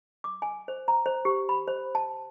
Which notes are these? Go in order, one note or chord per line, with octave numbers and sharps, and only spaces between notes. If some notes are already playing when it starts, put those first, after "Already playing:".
D6
G#5
C5
A#5
C5
G4
B5
C5
A5